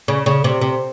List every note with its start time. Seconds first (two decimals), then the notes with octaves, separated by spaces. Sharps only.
0.08 C#3
0.26 C#3
0.44 C3
0.61 C3